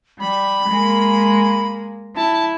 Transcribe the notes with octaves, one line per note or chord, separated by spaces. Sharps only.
G3 B5
G#3 A#3
E4 A5